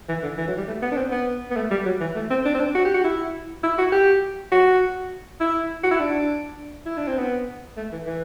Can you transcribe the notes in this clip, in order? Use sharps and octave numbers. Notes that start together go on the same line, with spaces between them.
E3
D3
E3
F#3
G3
A3
B3
D4
C4
B3
B3
A3
G3
F#3
E3
A3
C4
D4
C4
D4
F#4
G4
F#4
E4
E4
F#4
G4
F#4
E4
F#4
E4
D4
E4
D4
C4
B3
A3
E3
E3